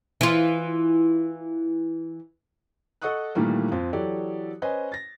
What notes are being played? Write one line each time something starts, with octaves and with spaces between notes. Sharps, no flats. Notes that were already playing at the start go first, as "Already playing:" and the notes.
E3 F4
A4 D#5 F#5 C#6 D#6 F#6
A#2 D#3 E3 G3 A3 A#3
F2 C4 F4
E3 F#3 G4 A4 D5
C#4 B4 C5 D#5 G#5
A6 A#6